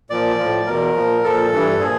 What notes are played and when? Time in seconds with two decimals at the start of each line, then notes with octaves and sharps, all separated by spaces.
0.10 A#2 F3 D5
0.38 A2 F3
0.67 E2 B2 A#4
0.95 A#2 F3
1.24 A#2 F3 A4
1.52 G2 E3
1.80 A#2 F3 G#4